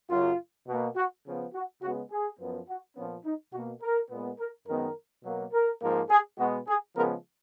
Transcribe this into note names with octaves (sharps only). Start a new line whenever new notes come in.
F#2 C#3 F#3 F4
B2 A#3
F#4
C#3 F3 B3
F#4
C#3 G#3 B3 F#4
G#4
F#2 F3 B3
F#4
A#2 F3 B3 C#4
D#4
B2 F#4
A#3
A#4
A#2 G#3 B3
A#4
F#2 D#3 G#3 B3 A#4
B2 F#3 A#3
A#4
G#2 F3 A#3
G#4
B2 G#3 B3 F#4
G#4
C#3 F3 G#3 B3 A#4